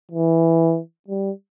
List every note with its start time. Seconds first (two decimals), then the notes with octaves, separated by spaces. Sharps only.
0.12 E3
1.08 G3